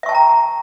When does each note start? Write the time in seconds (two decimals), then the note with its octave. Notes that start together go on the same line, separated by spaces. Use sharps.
0.03 E5
0.06 C#6
0.09 A5
0.12 G5
0.15 A#5